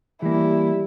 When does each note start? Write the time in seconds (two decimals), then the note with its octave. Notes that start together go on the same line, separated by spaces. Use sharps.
0.22 E3 G3 A#3 E4